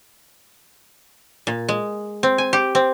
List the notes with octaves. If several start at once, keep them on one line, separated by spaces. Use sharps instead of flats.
A#2
G#3
C4
G#5
G4
C4